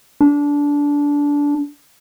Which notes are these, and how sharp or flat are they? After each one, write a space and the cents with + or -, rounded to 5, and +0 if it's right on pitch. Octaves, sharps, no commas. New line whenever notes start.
D4 -20